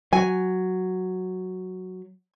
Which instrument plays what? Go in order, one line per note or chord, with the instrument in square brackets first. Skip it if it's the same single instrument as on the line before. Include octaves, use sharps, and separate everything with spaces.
[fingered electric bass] F#3 [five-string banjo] G#5